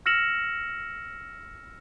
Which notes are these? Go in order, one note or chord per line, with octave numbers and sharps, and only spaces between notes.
E6 F6 A#6 C#7 E7 F#7